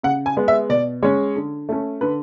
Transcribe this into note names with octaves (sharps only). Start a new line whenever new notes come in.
C#3 F#5
G#5
G#3 B3
E5
B2 D5
G#3 C#4 C#5
D3
A3 C#4
D3 B4